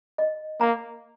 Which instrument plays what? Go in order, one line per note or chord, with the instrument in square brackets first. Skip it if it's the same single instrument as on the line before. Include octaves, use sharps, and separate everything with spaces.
[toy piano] D#5
[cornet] A#3 [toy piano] A#5